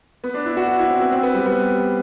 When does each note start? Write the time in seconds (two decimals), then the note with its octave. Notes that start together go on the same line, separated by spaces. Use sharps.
0.24 B3
0.34 D4
0.46 E4
0.57 F#4
0.68 F#4
0.79 E4
0.90 C4
1.01 B3
1.12 C4
1.23 B3
1.34 G3
1.46 B3